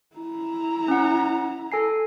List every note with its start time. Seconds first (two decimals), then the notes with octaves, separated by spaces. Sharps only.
0.15 E4 A#5
0.88 C#4 F#5
1.72 A4 G#5 C7